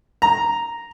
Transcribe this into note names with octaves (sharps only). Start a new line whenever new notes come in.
A#5